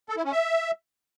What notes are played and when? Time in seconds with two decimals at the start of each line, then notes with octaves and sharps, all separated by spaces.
0.09 A4
0.17 E4
0.24 C#4
0.32 E5